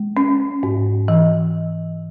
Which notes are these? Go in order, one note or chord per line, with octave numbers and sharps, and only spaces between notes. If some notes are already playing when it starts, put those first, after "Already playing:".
Already playing: G#3
C#4
G#2
E3